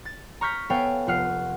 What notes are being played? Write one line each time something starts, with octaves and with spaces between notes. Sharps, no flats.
A6
A#5 C#6 F6 G6 B6
B3 A4 C#5 F5 G5 G#5
F1 F4 F#5 F6 C7